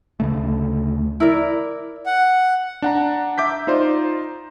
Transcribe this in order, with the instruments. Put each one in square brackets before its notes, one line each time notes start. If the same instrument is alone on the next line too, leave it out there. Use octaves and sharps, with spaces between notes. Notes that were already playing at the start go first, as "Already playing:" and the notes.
[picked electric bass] D2 C#3 A3
[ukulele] E4 A#4 D5
[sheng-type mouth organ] F#5
[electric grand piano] D4 F#5 A#5
E5 D6 G6 B6
D#4 F4 C5 D5 C6